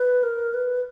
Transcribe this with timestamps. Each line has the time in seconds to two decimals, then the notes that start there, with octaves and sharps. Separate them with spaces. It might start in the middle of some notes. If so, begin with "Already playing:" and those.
Already playing: B4
0.23 A#4
0.54 B4